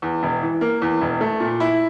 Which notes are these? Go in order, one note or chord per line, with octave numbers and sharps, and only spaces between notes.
E2
E1
E3
A#3
E2
E1
A3
A#2
E4